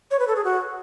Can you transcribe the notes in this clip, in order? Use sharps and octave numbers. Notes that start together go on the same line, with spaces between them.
C#5
B4
A4
G#4
F#4